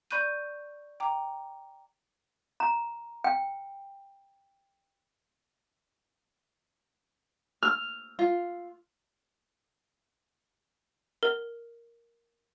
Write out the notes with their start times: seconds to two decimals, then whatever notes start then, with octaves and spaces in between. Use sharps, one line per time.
0.11 D5 B5 C#6 F#6 G6 D#7
1.00 G5 A#5 D6
2.60 A#5
3.24 G5
7.63 F6
8.19 F4
11.23 A#4